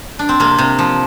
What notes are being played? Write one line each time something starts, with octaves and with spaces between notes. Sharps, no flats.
D4
C4
C3 A#3
C3
F3